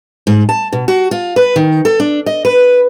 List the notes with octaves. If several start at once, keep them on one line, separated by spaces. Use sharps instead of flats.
G#2
A5
B2
F#4
F4
B4
D#3
A4
D4
D#5
B4